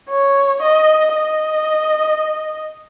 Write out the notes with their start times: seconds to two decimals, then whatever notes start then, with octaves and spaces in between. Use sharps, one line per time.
0.10 C#5
0.63 D#5
1.16 D#5